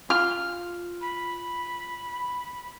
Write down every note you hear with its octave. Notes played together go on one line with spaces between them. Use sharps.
F4 F6
B5